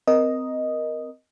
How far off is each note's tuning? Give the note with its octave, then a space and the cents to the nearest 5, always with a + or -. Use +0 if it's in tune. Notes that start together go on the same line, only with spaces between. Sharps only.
C4 -20 A#4 +10 D#5 +0